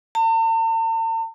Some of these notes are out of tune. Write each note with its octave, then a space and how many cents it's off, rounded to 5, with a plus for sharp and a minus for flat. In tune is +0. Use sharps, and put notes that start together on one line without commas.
A5 +45